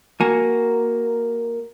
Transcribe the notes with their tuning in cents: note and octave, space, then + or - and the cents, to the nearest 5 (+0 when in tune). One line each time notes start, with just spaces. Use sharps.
A#3 +0 F#4 +0 G#5 +0